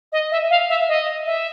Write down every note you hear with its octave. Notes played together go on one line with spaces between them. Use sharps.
D#5
E5
F5
E5
D#5
E5